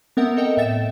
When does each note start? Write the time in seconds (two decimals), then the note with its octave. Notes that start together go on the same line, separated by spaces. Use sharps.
0.17 B3 C4 A#4 E5 F#5
0.37 A4 A#4 D#5 G5
0.57 A2 E5 A6 E7
0.70 A2